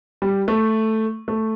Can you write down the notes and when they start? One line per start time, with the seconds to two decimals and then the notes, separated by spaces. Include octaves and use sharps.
0.22 G3
0.48 A3
1.28 A3